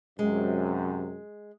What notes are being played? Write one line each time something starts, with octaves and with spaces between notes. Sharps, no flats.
F#2 C3 G#3